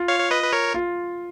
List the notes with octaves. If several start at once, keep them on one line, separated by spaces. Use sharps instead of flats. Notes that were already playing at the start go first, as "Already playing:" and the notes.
Already playing: F4
C#5 F5
C#5
B4 D#5
B4
A#4 C#5
F4